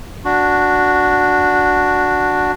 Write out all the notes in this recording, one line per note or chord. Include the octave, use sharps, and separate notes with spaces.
D4 F#4